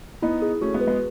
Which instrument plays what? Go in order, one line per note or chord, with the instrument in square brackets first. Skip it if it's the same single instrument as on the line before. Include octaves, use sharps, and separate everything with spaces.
[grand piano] B3 D#4 [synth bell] E4
[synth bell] G#4
[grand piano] A3 C#4 [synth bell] F#4
[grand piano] G#3 B3
[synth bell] B4
[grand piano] G#3 B3